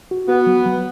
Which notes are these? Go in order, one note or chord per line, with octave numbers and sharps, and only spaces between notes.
F#4
B3 F#4
F#3
F#3